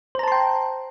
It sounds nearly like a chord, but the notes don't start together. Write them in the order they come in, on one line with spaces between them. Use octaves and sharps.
C5 A#5 A5 C6 G5